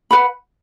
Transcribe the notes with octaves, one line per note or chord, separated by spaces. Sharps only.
B4 F#5 B5